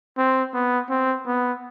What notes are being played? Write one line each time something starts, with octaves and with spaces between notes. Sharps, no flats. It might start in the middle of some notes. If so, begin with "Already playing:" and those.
C4
B3
C4
B3